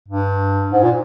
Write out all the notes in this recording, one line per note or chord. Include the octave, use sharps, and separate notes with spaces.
G2
G#2
A#2